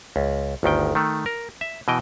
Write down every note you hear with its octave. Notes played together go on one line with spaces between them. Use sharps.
C#2
G1 D2 D#3 G5
D#3 A3
A#4
E5
B2 E3 D#5 G5